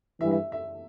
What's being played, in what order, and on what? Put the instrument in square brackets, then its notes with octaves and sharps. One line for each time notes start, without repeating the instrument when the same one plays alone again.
[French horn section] G2 E3 G3 [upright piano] E5
[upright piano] E5
E5